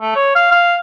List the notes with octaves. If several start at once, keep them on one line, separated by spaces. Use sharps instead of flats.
A3
C#5
F5
F5